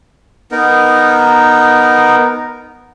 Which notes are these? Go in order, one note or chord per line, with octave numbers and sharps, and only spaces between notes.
B3 D#4 A#4